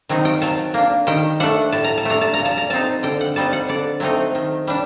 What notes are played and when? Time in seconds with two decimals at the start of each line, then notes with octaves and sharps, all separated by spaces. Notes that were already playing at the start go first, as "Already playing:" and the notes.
0.09 D#3 F#3 C4 D#4
0.25 G5
0.42 F#3 A5
0.74 A#3 D4
1.07 D#3 G5
1.40 A3 D4 F#5
1.72 A2 A5
1.84 A#5
1.98 A5
2.05 A3 D4 A#5
2.21 A5
2.33 A#5
2.39 A#2
2.45 A5
2.57 A#5
2.70 F#3 C4 D#4 A5
3.03 D3 G5
3.21 F#5
3.36 G3 C4 D#4 A5
3.53 F#5
3.69 D3 D5
4.00 F#3 A3 C4 D#4
4.35 D#3
4.67 G3 D4